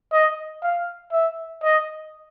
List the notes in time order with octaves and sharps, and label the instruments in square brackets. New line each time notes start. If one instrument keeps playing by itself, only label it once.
[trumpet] D#5
F5
E5
D#5